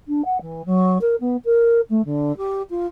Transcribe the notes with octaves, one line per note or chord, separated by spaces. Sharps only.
D4
F#5
E3
F#3
A#4
B3
A#4
A3
D3
G4
F4